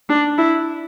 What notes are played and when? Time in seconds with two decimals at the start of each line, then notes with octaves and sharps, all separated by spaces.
0.09 D4
0.38 E4